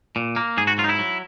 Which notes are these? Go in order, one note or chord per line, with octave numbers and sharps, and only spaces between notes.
A#2
A#3
G#2 G#4
F#4
F#3 F4
D#4
E4
F#3